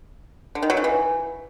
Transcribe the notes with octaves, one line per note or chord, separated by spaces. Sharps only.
D3
D#3
F#3
C#3
E3